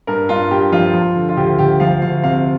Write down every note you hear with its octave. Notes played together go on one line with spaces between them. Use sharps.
G2 A#4
G2 F4
G2 G4
F3 F4
F3
D3
F4
D2 G4
D2 G4
F3 F5
D2 F5
C3 F5